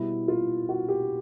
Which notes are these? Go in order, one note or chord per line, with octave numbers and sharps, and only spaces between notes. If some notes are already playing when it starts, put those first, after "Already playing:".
Already playing: B2 G3 E4
F4
F#4
G4